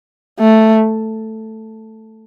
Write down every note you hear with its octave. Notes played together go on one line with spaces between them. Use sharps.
A3